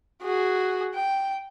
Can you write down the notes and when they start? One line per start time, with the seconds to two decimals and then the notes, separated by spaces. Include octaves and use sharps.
0.22 F#4 G#4
0.95 G5